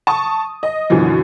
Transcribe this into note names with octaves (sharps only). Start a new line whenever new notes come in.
A5 C#6 D#6
D#5
F#2 B2 D3 E3 F3